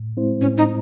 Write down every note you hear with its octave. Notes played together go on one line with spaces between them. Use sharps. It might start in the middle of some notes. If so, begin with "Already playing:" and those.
Already playing: A2
G#3 C4 E4 C5
A2 C#4
D#4